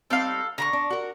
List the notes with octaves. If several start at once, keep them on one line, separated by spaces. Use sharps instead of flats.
G3 C4 D#4 A4 F5
D3 A#5 B5 C#6
D4
F#4 A#4